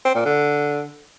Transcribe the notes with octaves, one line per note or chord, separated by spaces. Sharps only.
C4
A#2
D3